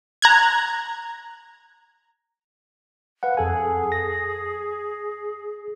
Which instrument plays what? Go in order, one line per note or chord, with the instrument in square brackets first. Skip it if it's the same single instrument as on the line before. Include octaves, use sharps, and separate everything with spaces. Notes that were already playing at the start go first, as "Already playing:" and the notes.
[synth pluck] A#5 F#6 G#6
[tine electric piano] B4 F5 F#5
[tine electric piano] F2 A4 G#5 [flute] G#4
[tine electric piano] A#6